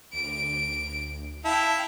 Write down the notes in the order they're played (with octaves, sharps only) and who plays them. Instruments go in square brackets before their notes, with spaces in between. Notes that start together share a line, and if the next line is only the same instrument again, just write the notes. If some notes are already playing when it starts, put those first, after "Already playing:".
[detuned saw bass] D2 [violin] D7
[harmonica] E4 [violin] F5 G5 [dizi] A5